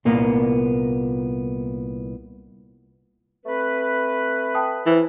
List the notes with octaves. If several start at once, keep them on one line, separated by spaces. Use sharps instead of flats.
C2 A#2 A#3 B3
A3 C4 B4
G5 A5 D#6
E3 E4 C5